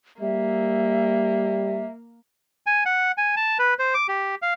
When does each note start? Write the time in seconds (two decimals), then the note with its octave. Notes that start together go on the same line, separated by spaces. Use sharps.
0.21 G3 A#3 E5
2.66 G#5
2.86 F#5
3.18 G#5
3.36 A5
3.59 B4
3.79 C5
3.94 D6
4.08 G4
4.42 F5